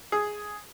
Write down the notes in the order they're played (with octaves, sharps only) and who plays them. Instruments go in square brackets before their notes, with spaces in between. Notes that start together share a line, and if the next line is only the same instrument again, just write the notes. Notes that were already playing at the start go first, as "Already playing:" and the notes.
[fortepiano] G#4